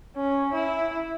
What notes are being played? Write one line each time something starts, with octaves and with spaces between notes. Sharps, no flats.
C#4
E4